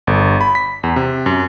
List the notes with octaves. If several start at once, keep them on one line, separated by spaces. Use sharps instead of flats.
G1
B5
B6
E2
C3
F#2